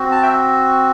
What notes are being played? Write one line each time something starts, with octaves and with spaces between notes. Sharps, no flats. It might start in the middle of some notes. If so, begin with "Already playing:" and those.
Already playing: C4 F#4
A5
E5 G5